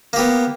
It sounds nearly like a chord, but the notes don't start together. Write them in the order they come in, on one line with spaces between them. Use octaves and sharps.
A#3 G4 B3